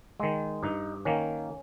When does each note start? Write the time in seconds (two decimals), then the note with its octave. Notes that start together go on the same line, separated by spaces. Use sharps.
0.20 D#3 G#3
0.63 G2 D#4
1.05 D#3 A#3 C#4